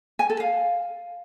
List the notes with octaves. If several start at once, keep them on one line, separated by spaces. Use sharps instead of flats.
G#5
A4
F5